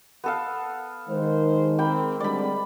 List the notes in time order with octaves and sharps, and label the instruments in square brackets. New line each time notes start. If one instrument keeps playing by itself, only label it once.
[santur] B3 A4 F5
[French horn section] D#3 G#3 [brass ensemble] C5
[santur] A#3 G5 B5 [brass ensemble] C4
[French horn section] D3 G#3 C4 [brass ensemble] G3 [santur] D5 B5